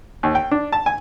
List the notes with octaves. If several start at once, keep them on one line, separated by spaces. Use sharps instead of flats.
D#2
G5
D4
A5
G#5